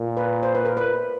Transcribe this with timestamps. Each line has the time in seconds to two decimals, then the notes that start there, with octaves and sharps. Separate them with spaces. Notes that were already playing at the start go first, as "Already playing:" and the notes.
Already playing: A#2
0.17 B4
0.43 C5
0.55 B4
0.65 A#4
0.77 B4